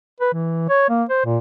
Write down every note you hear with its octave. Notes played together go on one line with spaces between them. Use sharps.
B4
E3
C#5
A#3
C5
A#2